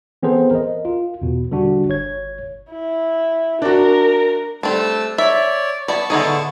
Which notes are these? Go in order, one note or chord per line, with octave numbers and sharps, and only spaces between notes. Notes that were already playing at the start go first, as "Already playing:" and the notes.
E3 B3 C4 G#4 A4 C5
A#4 D#5
F4
E2 B2
D3 G3 D4 F#4
G1 C#5 G#6
E4
D4 F#4 A#4
G3 A3 C4 D4 A5 E6
C#5 D5 E5
B3 E4 D5 A5 C#6
A2 D3 B3 D#4 G#4